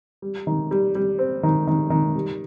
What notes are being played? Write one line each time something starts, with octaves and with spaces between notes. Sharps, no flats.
G3
D#3
G3
G3
C4
D#3
D#3
D#3
G3